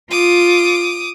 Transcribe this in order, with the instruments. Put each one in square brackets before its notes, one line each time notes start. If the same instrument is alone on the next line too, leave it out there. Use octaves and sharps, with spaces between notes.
[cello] F4 [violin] D6 D#6